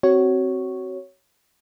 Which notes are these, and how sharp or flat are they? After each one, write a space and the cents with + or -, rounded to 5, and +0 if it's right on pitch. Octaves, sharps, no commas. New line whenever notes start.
C4 +0 F#4 +25 C#5 +0